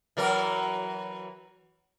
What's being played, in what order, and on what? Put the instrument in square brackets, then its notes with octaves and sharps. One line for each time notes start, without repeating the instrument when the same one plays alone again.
[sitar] E3 F#3 A#4